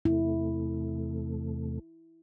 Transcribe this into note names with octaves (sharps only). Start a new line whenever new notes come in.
E2 C3 A3 E4